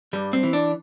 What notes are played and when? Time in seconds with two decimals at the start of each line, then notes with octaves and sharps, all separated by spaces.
0.13 G2 G3
0.33 C4
0.43 E3
0.53 D4